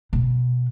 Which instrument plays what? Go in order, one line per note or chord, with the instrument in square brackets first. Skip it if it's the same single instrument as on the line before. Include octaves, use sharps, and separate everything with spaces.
[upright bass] B2